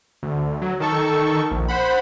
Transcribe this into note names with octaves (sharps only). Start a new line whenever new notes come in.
D2
F#3
D#3 A4 C#6
A#1
C5 F#5 B5